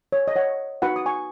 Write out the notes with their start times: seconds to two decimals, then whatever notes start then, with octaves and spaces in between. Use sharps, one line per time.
0.12 C#5
0.28 D#5
0.36 C#5 F#5
0.82 D#4 F#4 B4 F#5 B5
0.96 D#6
1.06 G#5 C#6